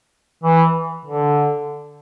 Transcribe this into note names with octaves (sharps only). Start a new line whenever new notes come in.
E3
D3